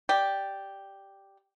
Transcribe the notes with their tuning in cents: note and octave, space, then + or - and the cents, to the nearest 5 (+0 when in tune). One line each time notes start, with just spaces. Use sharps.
G4 +0 D5 +0